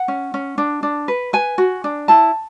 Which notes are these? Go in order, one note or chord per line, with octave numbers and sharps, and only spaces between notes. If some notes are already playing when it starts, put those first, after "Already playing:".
Already playing: F#5
C#4
C#4
D4
D4
B4
B4 G#5
F#4
D4
E4 A5